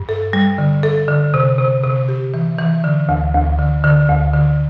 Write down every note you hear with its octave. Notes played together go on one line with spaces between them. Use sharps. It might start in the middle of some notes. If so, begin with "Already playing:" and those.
Already playing: G2
A4
G3
D3
A4
D3
C3
C3
C3
G4
E3
E3
D3
D2
D2
D3
D3
D2
D3